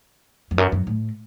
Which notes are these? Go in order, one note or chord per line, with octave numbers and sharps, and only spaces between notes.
F2
F#2
F#2
A2